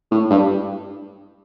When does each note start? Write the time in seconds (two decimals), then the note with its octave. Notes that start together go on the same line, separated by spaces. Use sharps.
0.11 A2
0.30 G2